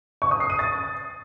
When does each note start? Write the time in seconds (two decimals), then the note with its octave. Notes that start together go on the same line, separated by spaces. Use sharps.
0.22 C#6
0.31 D#6
0.40 C7
0.50 D#7
0.59 A6